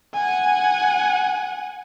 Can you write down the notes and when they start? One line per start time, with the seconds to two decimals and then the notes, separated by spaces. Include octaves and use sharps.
0.14 F#5 G#5